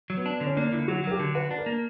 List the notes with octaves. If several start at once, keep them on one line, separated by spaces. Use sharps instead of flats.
F#3
B3
D4
D3
C#4
A#3 D4
D3 E4
F#3 F#4
F#3 A#4
G4
D3
F#4 B4
D4
A#4
A#3